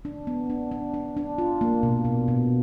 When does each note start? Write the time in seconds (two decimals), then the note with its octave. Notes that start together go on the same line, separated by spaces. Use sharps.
0.05 D4
0.27 B3
0.50 D4
0.71 D4
0.94 D4
1.17 D4
1.38 F4
1.61 A#3
1.83 B2
2.05 B2
2.28 B2